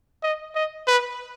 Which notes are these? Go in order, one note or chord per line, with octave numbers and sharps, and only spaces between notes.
D#5
D#5
B4